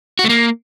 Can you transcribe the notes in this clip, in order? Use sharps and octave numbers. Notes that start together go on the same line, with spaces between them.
F#4
A3
A#3